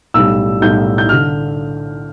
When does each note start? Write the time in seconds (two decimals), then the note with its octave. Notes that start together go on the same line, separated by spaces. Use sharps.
0.14 B1 A2 G3 E6
0.62 B1 A2 G3 G6
0.98 G6
1.09 D3 F6